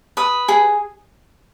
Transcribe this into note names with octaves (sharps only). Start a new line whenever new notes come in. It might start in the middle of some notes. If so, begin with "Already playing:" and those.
B4 D#6
G#4